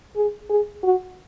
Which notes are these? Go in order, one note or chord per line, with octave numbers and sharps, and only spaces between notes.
G#4
G#4
F#4